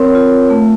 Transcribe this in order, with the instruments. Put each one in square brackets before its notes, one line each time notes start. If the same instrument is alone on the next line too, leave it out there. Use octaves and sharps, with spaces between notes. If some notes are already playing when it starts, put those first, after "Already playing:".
Already playing: [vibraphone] C4 A#4 C#5
F4
A3